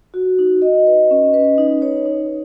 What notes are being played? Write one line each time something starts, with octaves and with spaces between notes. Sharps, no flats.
F#4
D#4
D#5
B4
C#4
B4
D#4
C#5
D#4